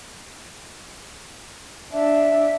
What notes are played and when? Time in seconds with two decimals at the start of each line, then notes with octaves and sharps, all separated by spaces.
1.93 D4 E5